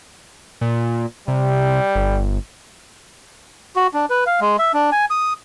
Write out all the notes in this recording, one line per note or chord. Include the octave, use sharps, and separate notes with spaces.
A#2
C3 G3
G1
F#4
D4
B4
F5
G#3
E5
D4
G#5
D#6